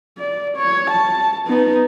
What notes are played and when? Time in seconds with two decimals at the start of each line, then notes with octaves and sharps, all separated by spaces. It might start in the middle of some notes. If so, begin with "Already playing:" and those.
0.18 D5
0.57 C#5
0.90 A5
1.48 B3 D#4